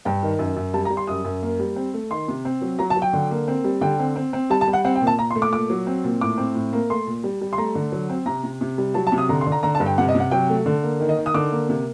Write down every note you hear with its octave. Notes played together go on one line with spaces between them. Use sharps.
G2 G5
D#3
F#2
F#2
G3 A5
A#5
G3
C6
F#2 D#6
F#2
A#3
G3
C4
A3
D#3 C6
C3
C4
F#3
F#3 A#5
A5
F#3
G5
D3
A#3
C4
G3
D3 G5
C4
C4
C4
G3 A5
A5
G3
F#5
C4 F#5
G5
A#2
A5
A#2 A#5
C6
A3
D6
A#2 D6
F#3
C4
A#2
A2 D6
C4
A2
A#3
A3 C6
A#2
G3
G3
C6
A3 A#5
D3
F#3
C4
C3 A#5
C3
C3
G3
F#3 A5
A5
C3
D#6
D3 A#5
C6
D3
A#5
D3 A#5
A5
G2
G5
C3 F#5
D#5
C3 F#5
F#3 G5
A3
D3
A#3
D#3
D#5
D#3
D#6
D3 D6
A#3
C3